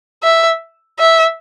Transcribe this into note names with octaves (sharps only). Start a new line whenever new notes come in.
E5
E5